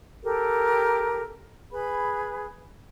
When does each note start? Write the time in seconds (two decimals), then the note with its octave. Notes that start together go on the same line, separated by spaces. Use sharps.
0.23 G4 A4 A#4
1.72 G#4 B4 B5